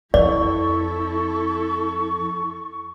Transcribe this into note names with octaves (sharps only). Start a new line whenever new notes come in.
F2 E4 A4 D5 C#6